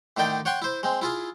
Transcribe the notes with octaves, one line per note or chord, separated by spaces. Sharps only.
A2 D3 D#3 D#4 D5 G5
C#5 F#5 G5 C6 C#6
E4 C5
G#3 C4
E4 F4 G#4